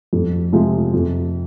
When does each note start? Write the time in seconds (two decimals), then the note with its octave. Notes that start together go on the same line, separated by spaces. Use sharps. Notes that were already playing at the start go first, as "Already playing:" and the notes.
0.13 F2
0.53 C3 F3 G#3
0.93 F2